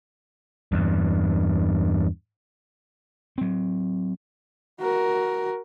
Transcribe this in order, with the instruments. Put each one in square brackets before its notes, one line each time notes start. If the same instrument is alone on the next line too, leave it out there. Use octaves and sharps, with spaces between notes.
[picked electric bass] E2 G2
[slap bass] F#3 C4
[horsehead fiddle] F#4 A#4